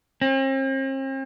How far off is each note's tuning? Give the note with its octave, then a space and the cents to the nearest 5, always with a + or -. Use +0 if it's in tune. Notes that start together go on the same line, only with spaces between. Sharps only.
C4 +45